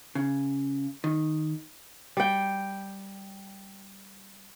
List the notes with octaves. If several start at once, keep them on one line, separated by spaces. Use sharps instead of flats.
C#3
D#3
G3 G5